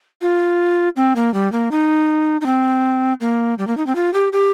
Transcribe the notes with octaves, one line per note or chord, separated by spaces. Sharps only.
F4
C4
A#3
G3
A#3
D#4
D#4
C4
A#3
G3
A#3
D#4
C4
F4
G4
G4